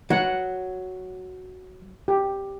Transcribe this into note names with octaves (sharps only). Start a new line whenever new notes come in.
F#3 F#5
G4